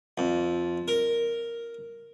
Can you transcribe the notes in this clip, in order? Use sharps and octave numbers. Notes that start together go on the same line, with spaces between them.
F2
A#4